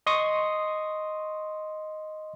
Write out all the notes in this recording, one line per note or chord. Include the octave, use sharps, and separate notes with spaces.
D#5 C6 C#6 D#6